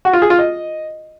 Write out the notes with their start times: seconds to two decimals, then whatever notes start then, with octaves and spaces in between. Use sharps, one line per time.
0.05 F#4
0.13 F4
0.22 G#4
0.30 F4
0.39 D#5